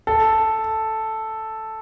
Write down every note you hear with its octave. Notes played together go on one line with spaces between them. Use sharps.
A4